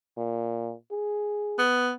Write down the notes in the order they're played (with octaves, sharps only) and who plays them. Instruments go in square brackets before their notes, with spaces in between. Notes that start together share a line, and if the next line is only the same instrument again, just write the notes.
[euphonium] A#2
G#4
[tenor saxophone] B3